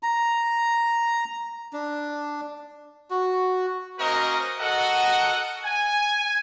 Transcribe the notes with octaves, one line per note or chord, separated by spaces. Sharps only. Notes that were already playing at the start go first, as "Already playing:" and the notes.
A#5
D4
F#4
A#3 C#4 F#4 A#4 C5 D#5
F#4 A4 A#4 D#5 F#5
G#5